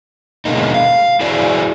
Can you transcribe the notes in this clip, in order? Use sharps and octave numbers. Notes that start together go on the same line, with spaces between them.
B2 D3 G#3 A#3 D#4
F5
E4 F#4 G#4 C5 D5